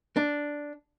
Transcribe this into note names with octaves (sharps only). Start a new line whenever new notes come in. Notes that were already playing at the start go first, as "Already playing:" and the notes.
D4